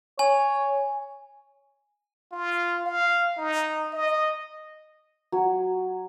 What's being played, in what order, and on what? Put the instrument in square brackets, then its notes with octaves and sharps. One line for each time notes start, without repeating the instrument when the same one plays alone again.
[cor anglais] C#5 [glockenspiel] G#5
[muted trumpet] F4
F5
D#4
D#5
[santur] F#3 G#5